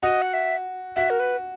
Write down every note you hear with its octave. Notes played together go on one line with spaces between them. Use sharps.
F#4 D#5
F#5
E5
F#4 E5
A#4
B4